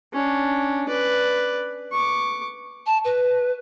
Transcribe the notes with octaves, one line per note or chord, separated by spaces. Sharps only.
C#4 D4
B4 D5
C#6 D6
A5
B4